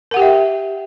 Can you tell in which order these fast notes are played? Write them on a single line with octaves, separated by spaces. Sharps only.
A#4 F#5 G4 G5 E5